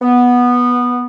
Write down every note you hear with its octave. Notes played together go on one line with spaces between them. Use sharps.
B3